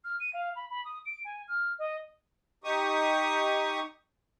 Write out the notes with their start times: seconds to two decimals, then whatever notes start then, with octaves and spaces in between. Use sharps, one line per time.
0.04 F6
0.20 D#7
0.33 F5
0.56 B5
0.70 B5
0.85 D#6
1.06 D7
1.25 G#5
1.48 F6
1.79 D#5
2.64 D#4 G4 C#6 D#6